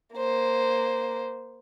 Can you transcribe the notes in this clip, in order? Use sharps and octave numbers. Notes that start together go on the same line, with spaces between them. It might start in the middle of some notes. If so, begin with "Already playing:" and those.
A#3 C5